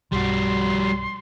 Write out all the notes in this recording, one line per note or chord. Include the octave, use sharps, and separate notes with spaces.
B1 G2 G3 F#4 C6